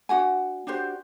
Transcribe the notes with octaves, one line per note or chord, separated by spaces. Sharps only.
D4 F#4 F#5 G#5
D4 F#4 G4 C5